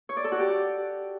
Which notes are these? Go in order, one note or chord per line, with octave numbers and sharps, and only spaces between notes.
C#5
D5
A4
F#4
G4